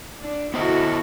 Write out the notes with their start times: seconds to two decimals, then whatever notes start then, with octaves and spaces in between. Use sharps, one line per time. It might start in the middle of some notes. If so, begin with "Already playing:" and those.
0.21 D4
0.54 B3 E4 F#4 A4 C5 D#5